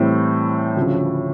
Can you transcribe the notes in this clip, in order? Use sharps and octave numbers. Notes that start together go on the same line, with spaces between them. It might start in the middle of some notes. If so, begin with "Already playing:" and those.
Already playing: A2 E3 G3 C4 E4
D2 C#3 F3